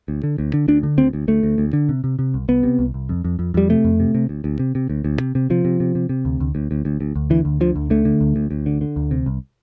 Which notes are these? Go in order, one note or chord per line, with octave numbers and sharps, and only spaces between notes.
D2
D3
D2
D3
D2 D4
D3
D2 C4
D2
D2 A3
D2
D2
D3
C3
C3
C3
C2
C2 B3
C3
C2
C2
F2
F2
F2
F2 G3
C3 A3
F2
C3
C3
D2
D2
C3
C3
D2
D2
C3
C3
C3 F3
C3
C3
C3
C3
D2
D2
D2
D2
D2
D2
D2
D3 E3
D2
D3 F3
D2
D3 A3
D3
D2
D2
D2
D3
D3
D2
C3
C2